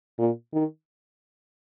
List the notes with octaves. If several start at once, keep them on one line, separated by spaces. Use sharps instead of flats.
A#2
D#3